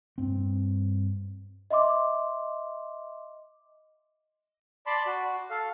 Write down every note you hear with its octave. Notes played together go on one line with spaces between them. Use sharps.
G2 C4
D#5 E5 C6 D6
D5 A5 B5 C6
F#4
A4 F5